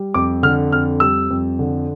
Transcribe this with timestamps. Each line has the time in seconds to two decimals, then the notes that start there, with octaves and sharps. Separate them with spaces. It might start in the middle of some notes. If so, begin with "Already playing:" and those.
Already playing: G3
0.14 F2 D6
0.43 D3 F6
0.72 F2 F6
1.00 G3 E6
1.30 F2
1.59 D3